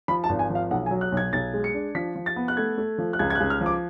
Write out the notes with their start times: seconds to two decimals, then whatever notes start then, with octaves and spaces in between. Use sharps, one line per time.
0.08 F3 B5
0.24 A5
0.29 G#1
0.39 G#5
0.50 F3
0.55 F5
0.71 B1 F#5
0.86 G#5
0.91 F#3
1.01 F#6
1.12 B1
1.17 G#6
1.33 B1 A6
1.54 G#3
1.64 C#7
1.74 D4
1.95 F3 B6
2.16 F3
2.26 A6
2.36 B3
2.48 F#6
2.57 A3 G#6
2.78 A3
2.98 F3
3.13 F#6
3.19 C#2 G#6
3.30 G#6
3.35 F#6
3.40 C#2
3.50 F6
3.61 F3
3.66 D6